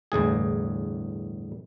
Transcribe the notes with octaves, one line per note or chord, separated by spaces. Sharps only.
G1 E2 A2 G#4